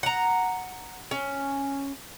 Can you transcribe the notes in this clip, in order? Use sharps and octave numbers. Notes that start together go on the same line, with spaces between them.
F#5 A#5
C#4